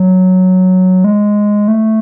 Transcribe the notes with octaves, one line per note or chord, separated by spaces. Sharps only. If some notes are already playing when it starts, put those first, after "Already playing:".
Already playing: F#3
G#3
A3